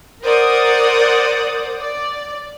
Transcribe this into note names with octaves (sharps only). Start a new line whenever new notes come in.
A#4 C5 D5 F#5 D#6
D5